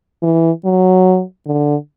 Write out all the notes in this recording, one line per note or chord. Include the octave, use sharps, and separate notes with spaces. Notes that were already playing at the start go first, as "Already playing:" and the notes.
E3
F#3
D3